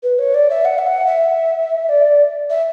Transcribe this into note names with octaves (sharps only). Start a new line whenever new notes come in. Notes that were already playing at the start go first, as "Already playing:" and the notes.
B4
C#5
D5
E5
F#5
E5
F#5
E5
D5
E5